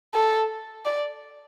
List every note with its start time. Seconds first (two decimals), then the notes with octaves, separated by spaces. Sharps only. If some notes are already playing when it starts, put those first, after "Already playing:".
0.14 A4
0.85 D5